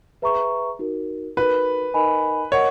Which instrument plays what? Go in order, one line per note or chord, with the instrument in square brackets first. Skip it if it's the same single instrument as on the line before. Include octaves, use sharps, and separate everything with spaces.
[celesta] G#4 B4 E5 A#5 C#6
D#4 F#4 A#4
[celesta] D#4 F#4 A#4 [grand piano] B4
[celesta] D#4 A#4 D#5 G#5 B5
[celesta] A#4 D#5 F#5 [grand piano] C#5